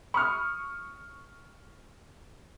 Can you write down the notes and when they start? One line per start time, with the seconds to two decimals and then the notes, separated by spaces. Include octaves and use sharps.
0.14 B5 C#6 D#6 F6